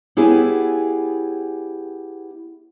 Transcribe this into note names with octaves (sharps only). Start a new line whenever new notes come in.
B3 E4 G4 G#4 C#5 E5